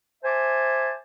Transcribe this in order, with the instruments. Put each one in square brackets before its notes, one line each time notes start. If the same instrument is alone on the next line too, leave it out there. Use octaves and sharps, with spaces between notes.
[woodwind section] C5 E5 G#5 A5 D6